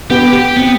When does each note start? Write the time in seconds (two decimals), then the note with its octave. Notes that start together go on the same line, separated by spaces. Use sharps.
0.10 B3 G4
0.33 G4
0.56 B3 C4